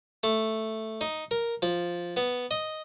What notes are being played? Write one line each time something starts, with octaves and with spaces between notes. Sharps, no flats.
A3
D#4
A#4
F3
B3
D#5